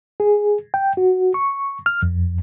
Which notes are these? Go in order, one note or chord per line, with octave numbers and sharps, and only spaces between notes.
G#4
G5
F#4
C#6
F6
F2